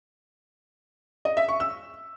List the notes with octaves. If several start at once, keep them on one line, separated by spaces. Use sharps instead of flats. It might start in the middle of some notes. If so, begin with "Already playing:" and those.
D#5
E5
C#6
E6